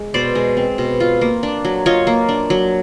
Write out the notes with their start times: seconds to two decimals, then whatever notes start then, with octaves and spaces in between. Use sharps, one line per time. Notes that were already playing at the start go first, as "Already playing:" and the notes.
Already playing: G#3
0.14 B2 C5 D5
0.35 G#3
0.57 C4
0.78 B2
1.00 F4
1.21 A#3
1.43 D4
1.65 F#3
1.86 F4 C#5 D#5
2.07 A#3
2.29 D4
2.50 F#3